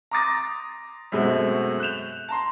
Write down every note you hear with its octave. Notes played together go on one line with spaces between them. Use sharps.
A#5 C6 D6 D#6 A6 A#6
F#2 B2 G#3 A3 C4 F#4
F#6 G6 E7 F7
A5 A#5 C6